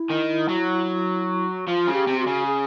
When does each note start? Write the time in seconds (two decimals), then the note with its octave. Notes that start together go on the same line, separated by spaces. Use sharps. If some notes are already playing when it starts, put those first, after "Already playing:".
Already playing: E4
0.10 D#3
0.49 F#3
1.67 F3 F4
1.87 C#3
1.93 G4
2.07 C3
2.20 F#4
2.26 C#3
2.46 G#4